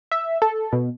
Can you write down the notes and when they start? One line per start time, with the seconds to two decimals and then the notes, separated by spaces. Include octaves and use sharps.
0.12 E5
0.42 A4
0.73 B2